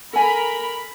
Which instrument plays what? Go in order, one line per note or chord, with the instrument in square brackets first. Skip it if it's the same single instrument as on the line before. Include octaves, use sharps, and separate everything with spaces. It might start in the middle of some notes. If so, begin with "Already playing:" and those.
[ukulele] A4 G#5 [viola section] A#4 B5